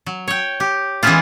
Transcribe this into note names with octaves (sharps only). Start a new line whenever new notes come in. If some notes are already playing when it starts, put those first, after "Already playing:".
F#3
C#5 G5
G4
E3 G#3 B3 C#4 E4 F4